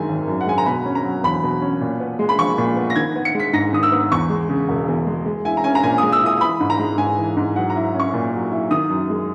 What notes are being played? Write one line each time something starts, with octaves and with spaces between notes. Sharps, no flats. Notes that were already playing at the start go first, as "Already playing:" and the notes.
Already playing: F#2 D#3 G#3 G#5
G#1
F#2
F#5
G#3 G#5
A#5
B2 B5
C#4
A#5
F#3
E2 B5
B2
C#4
A#2
B3
G#3
B5
A#1 C#6
A#2
B3
A#6
D#3 G#6
B3
C#7
G#3 B6
G#2 A#6
D#3 D#6
E6
B3
E2 C#6
G#3
C#3
E1
E2
G#3
G#3
E4 G#5
A#5
C#4 G#5
A#5
A#2 G#5
G#3 D#6
E6
E4 D#6
E3 B5
G#2
A#5
G#3
G#2 G#5
E3
G#2
F#3 F#5
A#5
E4
C#4
C#6
A#2
F#3
E4
D#3 D#6
F#2
G#3